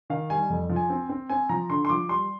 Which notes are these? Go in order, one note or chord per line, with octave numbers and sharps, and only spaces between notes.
D#3 F5
G3 G#5
F2
F3
G#5
C4
C4
C4 G#5
F3 A#5
D3 C6
C6
F3 D6
G3 C6